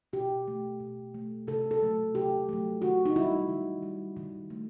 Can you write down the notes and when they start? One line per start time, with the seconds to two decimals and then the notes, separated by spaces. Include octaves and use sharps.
0.13 B2 G4
0.48 A3
0.80 B2
1.14 A3
1.47 C3 A4
1.71 A4
1.81 F#3 A3
2.15 C3 G4
2.49 F#3 A3
2.82 D#3 F#4
3.06 D#4
3.16 G3 E4
3.49 D#3
3.82 G3
4.17 D#3
4.50 A3